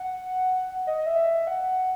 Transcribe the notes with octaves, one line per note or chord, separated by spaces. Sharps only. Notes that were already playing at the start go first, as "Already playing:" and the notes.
Already playing: F#5
D#5
E5
F#5